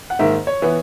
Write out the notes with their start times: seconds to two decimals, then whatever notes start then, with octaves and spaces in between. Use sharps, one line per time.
0.10 F#5
0.19 G#2 D#3 A#3 E5
0.47 C#5
0.62 E3 B3